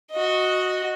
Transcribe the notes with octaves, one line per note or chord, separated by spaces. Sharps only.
F#4 D#5